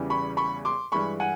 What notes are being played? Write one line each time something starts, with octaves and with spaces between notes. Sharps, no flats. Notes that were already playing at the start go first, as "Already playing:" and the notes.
Already playing: E2 C#3 E3 G3
B5 C#6
B5 C#6
C6 D6
G2 E3 G#3 B5 C#6
F#5 G#5